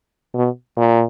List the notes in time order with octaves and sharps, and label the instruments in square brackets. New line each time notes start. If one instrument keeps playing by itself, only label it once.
[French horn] B2
A#2